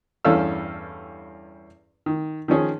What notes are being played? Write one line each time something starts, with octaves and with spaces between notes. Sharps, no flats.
E2 G2 C#4 A4 F5 E6
D#3
D#3 F3 C#4 G#4